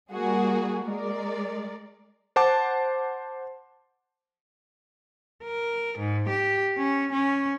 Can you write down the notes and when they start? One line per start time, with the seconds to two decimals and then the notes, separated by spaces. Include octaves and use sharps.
0.13 G3 A#3 F#4 G#4
0.84 G#3 A#4 D5
2.36 C5 F#5 A5 D6
5.44 A#4
5.99 G#2
6.29 G4
6.78 C#4
7.12 C#4